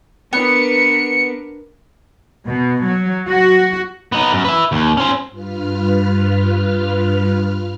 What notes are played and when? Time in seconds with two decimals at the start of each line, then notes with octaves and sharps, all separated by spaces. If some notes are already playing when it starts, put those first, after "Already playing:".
0.33 B3 D4 A#4 B4 C#7
2.47 B2
2.83 F#3
3.28 F#4
4.12 B3 D#4
4.33 F#2
4.45 B4 E5
4.72 D#2
4.97 C#4 C5
5.29 G2 F4 B4 F6